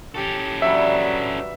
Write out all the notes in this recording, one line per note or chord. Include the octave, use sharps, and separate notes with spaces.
C#4 G4 A4
G2 E3 F#3 G3 E5